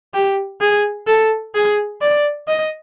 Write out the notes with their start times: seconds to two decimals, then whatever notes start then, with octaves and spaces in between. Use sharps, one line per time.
0.14 G4
0.61 G#4
1.07 A4
1.55 G#4
2.01 D5
2.48 D#5